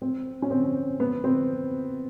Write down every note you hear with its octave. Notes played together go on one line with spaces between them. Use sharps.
C4
C#4
C4
B3
C4